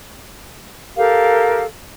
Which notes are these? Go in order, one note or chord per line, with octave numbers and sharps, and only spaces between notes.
G4 A4 A#4 F5